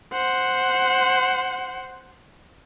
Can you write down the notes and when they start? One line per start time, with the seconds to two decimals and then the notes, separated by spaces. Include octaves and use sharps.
0.13 C5 F#5